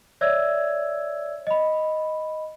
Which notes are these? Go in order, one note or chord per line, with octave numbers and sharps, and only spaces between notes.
C#5 D5 E5 E6 G#6
D#5 B5